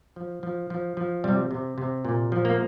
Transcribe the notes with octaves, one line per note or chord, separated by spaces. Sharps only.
F3
F3
F3
F3
C3 G3
C3
C3
A#2
F3
A#3